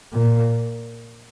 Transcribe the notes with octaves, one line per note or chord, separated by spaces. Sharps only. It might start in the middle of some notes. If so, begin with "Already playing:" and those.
A#2